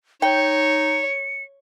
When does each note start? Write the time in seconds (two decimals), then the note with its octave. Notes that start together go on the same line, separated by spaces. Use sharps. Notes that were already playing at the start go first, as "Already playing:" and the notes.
0.22 D#4 C#5 G5 C#7